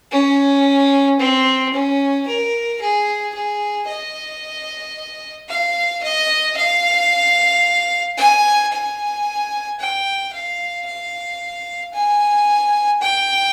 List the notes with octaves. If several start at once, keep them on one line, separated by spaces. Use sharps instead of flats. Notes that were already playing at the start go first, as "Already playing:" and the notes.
C#4
C4
C#4
A#4
G#4
G#4
D#5
F5
D#5
F5
G#5
G#5
G5
F5
F5
G#5
G5